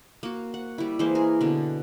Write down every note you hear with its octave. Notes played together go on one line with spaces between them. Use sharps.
A#3 F#4
F#5
G3 E4
E3 G#3 A#3 C5
G#4 A#4
B2 D3